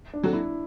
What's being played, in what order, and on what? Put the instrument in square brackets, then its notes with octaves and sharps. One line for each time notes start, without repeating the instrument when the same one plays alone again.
[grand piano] D4
[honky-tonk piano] F#3 C4 F#4 A4
[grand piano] E4